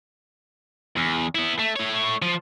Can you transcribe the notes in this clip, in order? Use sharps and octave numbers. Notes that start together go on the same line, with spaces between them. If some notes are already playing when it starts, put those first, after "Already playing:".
E2
B3 E4
A3
A3 C#5
F3